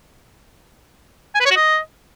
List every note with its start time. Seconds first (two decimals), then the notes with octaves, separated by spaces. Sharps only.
1.35 G#5
1.40 B4
1.46 C#5
1.51 F#4
1.56 D#5